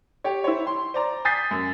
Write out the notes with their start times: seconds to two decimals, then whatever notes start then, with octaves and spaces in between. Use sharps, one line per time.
0.24 G4 C#5
0.44 E4 C5 C#5
0.67 C6
0.94 C5 D5 A#5
1.25 G#5 D#6 G6 A6 B6 C7
1.51 F#2